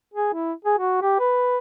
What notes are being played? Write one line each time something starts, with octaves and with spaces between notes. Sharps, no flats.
G#4
E4
G#4
F#4
G4
B4